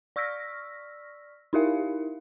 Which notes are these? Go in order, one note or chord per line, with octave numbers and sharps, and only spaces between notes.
D5 C#6 E6 F6 A#6 B6
D#4 E4 G4 A#4 E5 F5